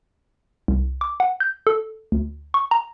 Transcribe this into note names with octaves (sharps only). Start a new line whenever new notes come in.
C2
D6
F#5
G6
A4
D2
C#6
A#5